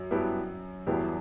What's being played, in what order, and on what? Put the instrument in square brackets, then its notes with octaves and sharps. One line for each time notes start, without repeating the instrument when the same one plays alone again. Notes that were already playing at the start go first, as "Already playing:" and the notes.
Already playing: [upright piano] F#2
[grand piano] G2 F#3 B3 E4 G4
[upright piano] E2 [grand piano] G2 F#3 B3 E4 G4